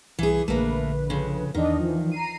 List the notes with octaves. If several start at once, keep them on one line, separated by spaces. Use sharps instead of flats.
C2 E3 G#4
A#1 D3 A3 A#3 B4
F2 C#3
E2 D#3 D4 D#5
E3 F3
A#5 C7 D#7